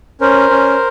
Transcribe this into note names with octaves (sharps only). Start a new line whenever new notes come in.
C#4 A#4 C5
C#4